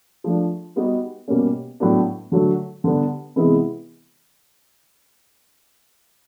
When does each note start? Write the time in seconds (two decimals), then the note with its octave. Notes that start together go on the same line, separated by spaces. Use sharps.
0.24 F3 A3 D4
0.76 G3 B3 D#4 F#4
1.28 B2 G3 A#3 C#4
1.80 A2 F#3 B3 D4
2.32 D3 F#3 A3
2.84 D3 G3 B3 D4
3.36 C3 E3 G#3 B3 E4